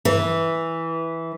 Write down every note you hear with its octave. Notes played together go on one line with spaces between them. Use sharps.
E3